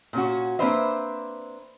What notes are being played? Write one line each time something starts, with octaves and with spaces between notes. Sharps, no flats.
A#2 C#4 F#4
A#3 C4 D4 B4 C5 E5